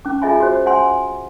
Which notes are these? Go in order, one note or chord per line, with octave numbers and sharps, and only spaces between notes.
C#4 D6
F4 G#4 D#5 E5 G#5 B5
F4 F#4 C5
E5 F#5 G#5 C6
G#5